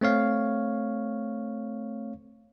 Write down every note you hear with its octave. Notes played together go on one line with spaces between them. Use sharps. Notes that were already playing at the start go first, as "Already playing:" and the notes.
A3 C4 C#5 F5